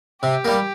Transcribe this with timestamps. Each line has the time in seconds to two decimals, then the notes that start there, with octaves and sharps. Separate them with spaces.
0.23 C3 G4
0.45 G3 A#3